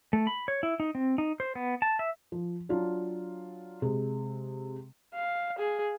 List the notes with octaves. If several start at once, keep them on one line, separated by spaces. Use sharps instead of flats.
A3
B5
C#5
E4
D#4
C4
D#4
C5
B3
A5
E5
F3
F#3 D4 F4
C3 G#3
F5
G#4